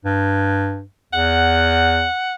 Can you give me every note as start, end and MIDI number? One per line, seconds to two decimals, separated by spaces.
0.05 0.84 43
1.13 2.06 40
1.13 2.35 78